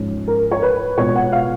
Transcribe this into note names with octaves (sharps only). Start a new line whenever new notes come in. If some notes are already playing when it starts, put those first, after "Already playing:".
Already playing: G#2 F3 G#3 C#4
A#4
C#5
B4
B2 G#3 B3 F4 C#5
F#5
F5